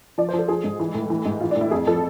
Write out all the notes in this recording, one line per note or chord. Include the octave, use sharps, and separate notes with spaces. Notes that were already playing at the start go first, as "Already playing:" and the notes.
F3 D5
C5
F3
A4
F3 G#4
G#2
E3
A2
E3
G#2
E3 F4
D4
A2
E4
F2 G#4
F3 A4